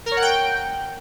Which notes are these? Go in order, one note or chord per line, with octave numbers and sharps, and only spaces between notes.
A#4
C#5
F#5
G5